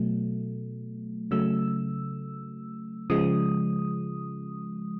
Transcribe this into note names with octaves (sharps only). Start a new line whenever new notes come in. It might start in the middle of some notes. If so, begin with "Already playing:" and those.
Already playing: B2 F#3 A3
C#3 F#3 A3 E6
C#3 F3 G#3 D#6